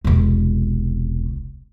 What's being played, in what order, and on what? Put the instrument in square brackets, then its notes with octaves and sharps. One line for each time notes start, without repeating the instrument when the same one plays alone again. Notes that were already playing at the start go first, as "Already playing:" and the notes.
[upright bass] E1 C2